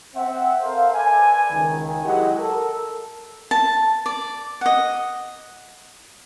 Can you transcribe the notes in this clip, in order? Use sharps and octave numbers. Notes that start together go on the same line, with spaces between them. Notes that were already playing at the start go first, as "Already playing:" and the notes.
C4 E5 F#5
A4 A#4 C5 E5 F5
A4 B4 D5 G#5
C#2 D#3
F#3 G#3 E4 G4 D#5 F#5
A4 A#4
A5
D5
D#5 F#5